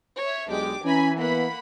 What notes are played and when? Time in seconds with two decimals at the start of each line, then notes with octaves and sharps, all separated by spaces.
0.18 C#5 E5
0.48 B1 G#3 D4 G4 D6
0.85 E3 C#4 G#5 A#5 B5
1.18 A#3 B3 F#5 B5